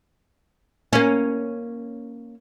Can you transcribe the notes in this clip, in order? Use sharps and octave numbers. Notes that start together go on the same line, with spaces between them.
A#3 C#4